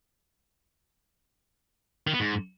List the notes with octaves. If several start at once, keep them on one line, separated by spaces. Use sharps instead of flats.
D#3
B3
G#2